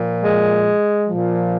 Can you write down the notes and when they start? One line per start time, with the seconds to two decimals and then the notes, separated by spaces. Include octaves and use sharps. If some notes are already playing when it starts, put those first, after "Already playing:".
Already playing: A#2 F3
0.23 G#3
1.08 A#2 F3